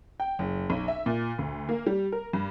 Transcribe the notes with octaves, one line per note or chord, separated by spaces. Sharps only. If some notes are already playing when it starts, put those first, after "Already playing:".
G5
F#1
B1
E5
A#2
D2
A#3
G3
A#4
G2